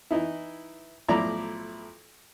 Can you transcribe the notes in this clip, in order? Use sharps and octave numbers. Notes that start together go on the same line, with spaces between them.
E3 D#4 E4
B1 A2 F3 E4 D5 A#5